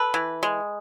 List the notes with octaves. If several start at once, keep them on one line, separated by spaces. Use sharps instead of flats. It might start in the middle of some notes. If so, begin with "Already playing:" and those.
Already playing: A4 B4
E3
G#3